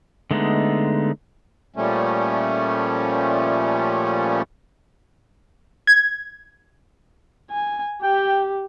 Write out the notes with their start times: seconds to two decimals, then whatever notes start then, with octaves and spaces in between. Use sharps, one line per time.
0.31 D3 G#3 A3 B3 D#4
1.76 A#2 F3 G3 A3 C#4
5.87 G#6
7.51 G#5
8.03 G4 G5